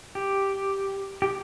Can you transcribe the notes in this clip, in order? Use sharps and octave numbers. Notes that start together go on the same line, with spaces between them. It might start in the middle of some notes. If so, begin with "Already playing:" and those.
G4
G4